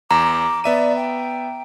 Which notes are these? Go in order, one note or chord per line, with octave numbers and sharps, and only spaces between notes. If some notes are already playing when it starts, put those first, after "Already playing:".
E2 A#5 D6
B3 D5 E5 D#7
G5